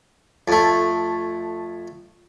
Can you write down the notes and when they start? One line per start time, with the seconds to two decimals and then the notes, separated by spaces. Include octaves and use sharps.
0.48 F2 A3